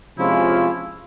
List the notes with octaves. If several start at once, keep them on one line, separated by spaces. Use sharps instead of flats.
C3 F3 G#3 C#4 E4 F4